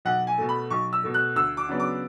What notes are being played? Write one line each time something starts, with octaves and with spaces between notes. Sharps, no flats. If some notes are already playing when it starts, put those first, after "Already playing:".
B1 F#5
G#5
B2 A3
B5
B1 C#6
E6
B2 A3
F#6
D2 E6
D6
C#3 F#3 B3 D4
D6